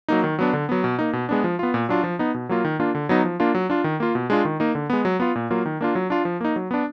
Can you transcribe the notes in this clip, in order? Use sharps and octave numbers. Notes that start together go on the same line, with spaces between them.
F#3 A#3 D#4
D#3
F#3 B3 D4
D3
F#3 B3
B2
A#3 D#4
B2
G#3 B3 D4
F3
B3 F4
A#2
F#3 D4 F4
F3
B3 D#4
B2
F#3 A#3 F4
D#3
A#3 D4 F4
D3
F#3 B3 D#4
F3
A#3 D4 F4
F#3
D4 F4
D#3
A#3 F4
B2
G#3 D4 F4
D#3
A#3 D#4
D3
G#3 B3
F#3
B3 F4
A#2
F#3 A#3 F4
D#3
A#3 D4 F4
F#3
D4 F4
F3
A#3 D#4
F#3
B3 D4